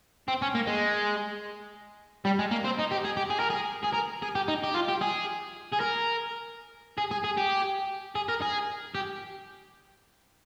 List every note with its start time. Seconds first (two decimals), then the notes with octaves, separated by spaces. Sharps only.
0.28 C4
0.42 C#4
0.55 A#3
0.67 G#3
2.25 G3
2.39 G#3
2.51 A#3
2.64 C4
2.78 D#4
2.91 G4
3.05 G#4
3.17 G4
3.30 G#4
3.40 A#4
3.50 G#4
3.83 G#4
3.93 A#4
4.22 G#4
4.35 G4
4.48 D#4
4.63 G4
4.74 F4
4.88 G4
5.01 G#4
5.72 G#4
5.80 A#4
6.98 G#4
7.11 G#4
7.24 G#4
7.37 G4
8.15 G#4
8.28 A#4
8.42 G#4
8.95 G4